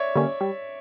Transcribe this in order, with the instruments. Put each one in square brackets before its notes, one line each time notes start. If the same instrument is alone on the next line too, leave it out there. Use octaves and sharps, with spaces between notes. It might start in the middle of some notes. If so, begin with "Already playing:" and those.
Already playing: [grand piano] C#5 D5 E5
[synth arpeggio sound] D3 G3 A#3 C#4
G3